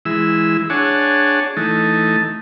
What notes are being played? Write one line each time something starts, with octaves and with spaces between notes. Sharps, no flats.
E3 G#3 E4 E6
D4 G#4 C#5 F#5 G#5 A5
E3 A3 D#4 A5